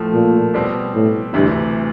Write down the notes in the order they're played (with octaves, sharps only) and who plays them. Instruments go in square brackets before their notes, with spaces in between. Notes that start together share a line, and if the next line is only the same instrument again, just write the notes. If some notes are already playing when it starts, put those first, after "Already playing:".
Already playing: [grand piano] A2 F3 A3
[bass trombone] A#2
[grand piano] B2 G3 C4
[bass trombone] A2
[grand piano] D2 C3 E3 [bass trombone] G2